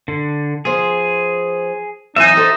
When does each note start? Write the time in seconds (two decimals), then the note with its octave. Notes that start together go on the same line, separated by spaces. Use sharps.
0.08 D3
0.65 F3 B3 G#4 C5
2.16 E3 F#3 C4 D#4 E5 G#5
2.36 G4 A4 C5 E5